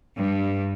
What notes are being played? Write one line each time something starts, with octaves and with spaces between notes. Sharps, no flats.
G2